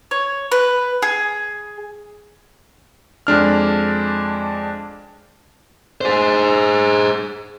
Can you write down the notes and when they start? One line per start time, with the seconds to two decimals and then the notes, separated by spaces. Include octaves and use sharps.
0.11 C#5
0.52 B4
1.02 G#4
3.27 F2 G#3 D4 F6
6.01 G#4 C5